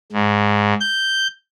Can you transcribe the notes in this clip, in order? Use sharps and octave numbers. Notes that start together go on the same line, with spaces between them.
G#2
G6